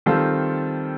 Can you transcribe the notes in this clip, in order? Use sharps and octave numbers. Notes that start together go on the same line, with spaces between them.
D#3 G3 C4 F4 A4